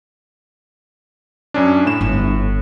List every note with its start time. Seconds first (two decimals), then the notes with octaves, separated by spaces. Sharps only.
1.54 F#2 C#4 D4
1.86 A2 E7
2.01 G1